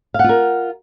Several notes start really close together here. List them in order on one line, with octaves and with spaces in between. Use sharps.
F5 F#5 F4 A#4